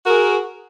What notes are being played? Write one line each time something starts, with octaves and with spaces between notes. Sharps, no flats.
F#4 G#4 A#4